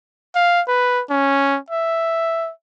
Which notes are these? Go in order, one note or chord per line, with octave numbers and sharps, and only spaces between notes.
F5
B4
C#4
E5